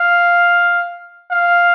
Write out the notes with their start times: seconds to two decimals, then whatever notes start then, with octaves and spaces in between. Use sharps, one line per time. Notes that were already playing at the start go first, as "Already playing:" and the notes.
Already playing: F5
1.31 F5